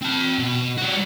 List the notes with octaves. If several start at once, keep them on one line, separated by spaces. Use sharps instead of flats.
C4 A5
B2
G3 F#4